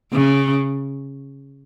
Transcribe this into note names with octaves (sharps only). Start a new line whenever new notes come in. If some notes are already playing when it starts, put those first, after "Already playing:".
C#3